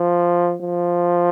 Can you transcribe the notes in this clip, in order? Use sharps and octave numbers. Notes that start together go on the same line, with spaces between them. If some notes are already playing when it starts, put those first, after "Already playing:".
Already playing: F3
F3